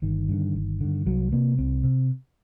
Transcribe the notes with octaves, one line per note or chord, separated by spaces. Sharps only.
G1 D#3
G2 D3
G1
G2 D3
C2 F#3
C3 A#3
C2 C4
C3